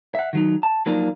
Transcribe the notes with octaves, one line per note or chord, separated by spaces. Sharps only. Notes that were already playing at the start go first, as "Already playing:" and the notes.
E5 F#5
D#3 F#3 D#4
A5
F3 F#3 A#3 D4 D#4 F4